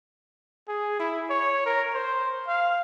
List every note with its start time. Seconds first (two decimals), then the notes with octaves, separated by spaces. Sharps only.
0.68 G#4
0.99 E4
1.30 C#5
1.66 A#4
1.94 C5
2.48 F5